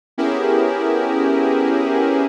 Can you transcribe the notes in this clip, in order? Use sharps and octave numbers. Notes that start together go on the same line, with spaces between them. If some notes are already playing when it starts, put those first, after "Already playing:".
B3 C#4 E4 G4 G#4 A#4